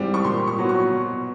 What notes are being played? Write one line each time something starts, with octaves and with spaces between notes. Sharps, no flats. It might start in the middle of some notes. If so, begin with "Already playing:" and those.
Already playing: G#2 E3 G3 C4
C#6
A#2 C6
C#6
F#3 B3
C#6
B2